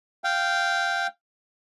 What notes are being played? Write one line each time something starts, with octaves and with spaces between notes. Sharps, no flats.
F5 G5